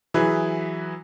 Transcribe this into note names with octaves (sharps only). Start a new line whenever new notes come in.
E3 F#3 E4 G#4 B4